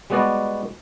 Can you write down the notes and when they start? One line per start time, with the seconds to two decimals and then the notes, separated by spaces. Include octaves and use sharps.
0.10 G3 G#3 B3 F#4 D5 D#5